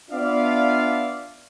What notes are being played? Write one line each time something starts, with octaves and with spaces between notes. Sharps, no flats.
B3 D4 F4 D5 E5 F5